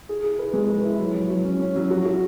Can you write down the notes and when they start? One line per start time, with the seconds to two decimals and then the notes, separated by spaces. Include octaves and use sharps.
0.09 G#4
0.23 G#4
0.39 B4
0.53 G#3
0.69 B4
0.84 E4
0.99 F#3
1.14 F#3
1.30 F#3
1.44 C#4
1.60 C#4
1.76 F#3
1.91 F#4
2.06 F#4